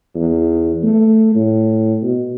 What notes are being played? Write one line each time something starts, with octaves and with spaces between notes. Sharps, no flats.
E2
A3
A2
B2